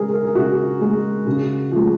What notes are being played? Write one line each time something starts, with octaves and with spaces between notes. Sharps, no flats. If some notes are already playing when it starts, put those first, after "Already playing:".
Already playing: C#3 G#3 G#4 A#4
A#4
G#4
C#3 F#4
G#3
C#3
F3 G#3